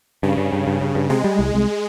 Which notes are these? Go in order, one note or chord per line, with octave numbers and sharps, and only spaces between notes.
G2 C#3
G2
G2
G2
G2
G2
C3 G#3
G3
C2
C2